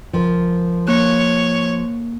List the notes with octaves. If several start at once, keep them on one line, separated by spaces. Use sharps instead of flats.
C#2 F3 A#4
A#3 C#5 F#6